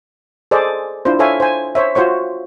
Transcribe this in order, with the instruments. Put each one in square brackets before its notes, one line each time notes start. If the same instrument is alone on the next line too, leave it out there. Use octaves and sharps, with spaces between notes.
[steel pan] G#4 A4 C5 D5 D#5
D4 E4 F4 C5
A4 C5 C#5 E5 F5 G#5
C5 G#5
C5 C#5 E5
F4 F#4 C5 C#5 C#6